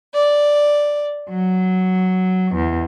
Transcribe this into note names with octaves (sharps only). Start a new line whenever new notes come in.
D5
F#3
E2